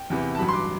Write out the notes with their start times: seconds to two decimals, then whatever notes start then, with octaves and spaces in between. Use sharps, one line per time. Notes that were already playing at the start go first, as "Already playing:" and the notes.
Already playing: G5
0.10 E2 C3 E3
0.35 A5
0.38 A1 G2 F#3 B5
0.49 C6
0.53 D6